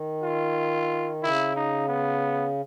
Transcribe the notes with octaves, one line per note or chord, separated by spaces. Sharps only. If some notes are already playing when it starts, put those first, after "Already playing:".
Already playing: D#3
F4
C#3 E4
D#4
B3